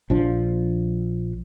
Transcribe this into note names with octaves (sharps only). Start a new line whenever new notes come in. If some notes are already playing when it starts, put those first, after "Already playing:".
A#1 F3 D4